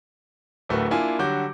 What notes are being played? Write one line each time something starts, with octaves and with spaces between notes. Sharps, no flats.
D1 D2 A3 F#4 A#4 B4
A#3 D4 E4 F4 G#5
D3 F#3 G3 F#4 D6 G6